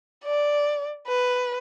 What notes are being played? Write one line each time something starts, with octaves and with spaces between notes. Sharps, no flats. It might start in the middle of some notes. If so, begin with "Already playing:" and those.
D5
B4